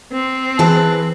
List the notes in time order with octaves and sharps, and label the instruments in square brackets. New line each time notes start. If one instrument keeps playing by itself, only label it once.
[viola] C4
[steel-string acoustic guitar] E3 G#4 B4 [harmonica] A5